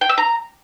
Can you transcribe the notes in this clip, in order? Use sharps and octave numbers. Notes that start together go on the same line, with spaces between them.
G5
E6
A#5